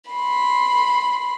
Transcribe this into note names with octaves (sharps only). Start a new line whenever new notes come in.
B5 C6